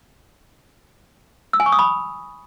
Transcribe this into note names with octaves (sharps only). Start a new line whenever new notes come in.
E6
G#5
C#6
D#6
B5